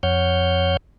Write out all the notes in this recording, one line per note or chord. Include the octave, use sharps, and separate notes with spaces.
F2 C#5 F#5 F6 G6